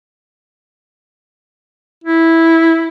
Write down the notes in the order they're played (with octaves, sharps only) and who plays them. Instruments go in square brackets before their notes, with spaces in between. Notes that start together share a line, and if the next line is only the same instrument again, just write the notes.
[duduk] E4